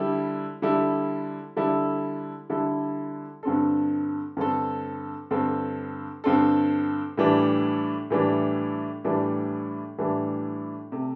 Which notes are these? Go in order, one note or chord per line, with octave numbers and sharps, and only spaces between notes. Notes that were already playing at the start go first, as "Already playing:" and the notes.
Already playing: D3 G3 E4 A4
D3 G3 E4 A4
D3 G3 E4 A4
D3 G3 E4 A4
G2 D3 C4 A4
G2 D3 C4 A4
G2 D3 C4 A4
G2 D3 C4 A4
A2 E3 G3 D4
A2 E3 G3 D4
A2 E3 G3 D4
A2 E3 G3 D4
C3 A3